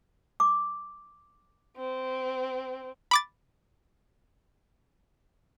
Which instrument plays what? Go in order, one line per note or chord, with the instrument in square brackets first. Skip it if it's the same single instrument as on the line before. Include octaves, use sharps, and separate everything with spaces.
[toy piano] D6
[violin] C4
[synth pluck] B5 D6 A6